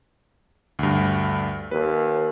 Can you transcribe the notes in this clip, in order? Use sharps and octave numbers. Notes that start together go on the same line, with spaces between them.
D2 G2
D#2 B4